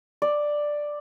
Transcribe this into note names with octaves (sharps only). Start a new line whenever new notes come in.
D5